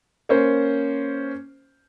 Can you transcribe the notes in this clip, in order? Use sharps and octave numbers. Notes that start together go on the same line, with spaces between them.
A#3 C#4 C5